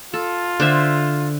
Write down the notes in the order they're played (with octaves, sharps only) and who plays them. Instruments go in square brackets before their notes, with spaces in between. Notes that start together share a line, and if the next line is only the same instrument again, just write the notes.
[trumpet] F4 [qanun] A4
[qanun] D3 C5 E5